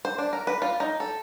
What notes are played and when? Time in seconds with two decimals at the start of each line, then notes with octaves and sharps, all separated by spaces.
0.05 C5
0.18 D4
0.33 A#4
0.47 B4
0.62 F4
0.80 D#4
1.00 A4